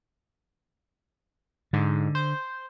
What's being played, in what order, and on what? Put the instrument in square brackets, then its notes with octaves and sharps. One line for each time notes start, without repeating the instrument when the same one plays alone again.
[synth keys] G#2 [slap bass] D3
[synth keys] C5